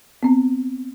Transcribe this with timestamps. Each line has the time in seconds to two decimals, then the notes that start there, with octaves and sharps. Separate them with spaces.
0.23 B3 C4